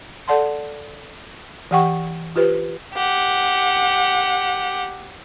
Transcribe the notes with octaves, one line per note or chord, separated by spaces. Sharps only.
A4 D5 F#5 A5 C6
E3 G4 F#5 G5 C#6
F4 G4 B4 C5
G4 F#5